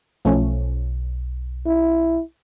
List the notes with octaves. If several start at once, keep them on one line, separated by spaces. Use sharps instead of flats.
B1 F3 A3 C#4
E4